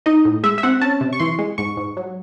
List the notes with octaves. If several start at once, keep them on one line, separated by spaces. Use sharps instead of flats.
D#4 D#5
A2
G#3 E5
E5
C4 F#5
C#4 A5
C3
C#6
E3 C6
G#3
G#2 C#6
G#2
F#3